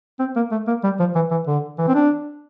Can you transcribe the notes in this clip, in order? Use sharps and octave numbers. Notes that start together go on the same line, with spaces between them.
C4
A#3
A3
A#3
G3
F3
E3
E3
D3
E3
C4
D4